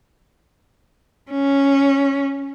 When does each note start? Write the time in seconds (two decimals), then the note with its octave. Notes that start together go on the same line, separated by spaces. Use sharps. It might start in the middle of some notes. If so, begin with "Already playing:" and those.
1.31 C#4